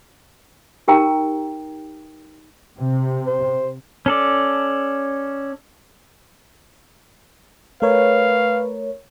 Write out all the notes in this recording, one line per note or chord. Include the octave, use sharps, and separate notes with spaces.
D#4 G4 A#4 G5 A#5
C3
C5
C#4 A4 D5
A3 A#4 B4 C#5 F5